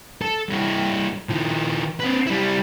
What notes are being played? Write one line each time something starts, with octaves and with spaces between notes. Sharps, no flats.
A4
G2 E4
D#3 F3
C4 B4
G3 E4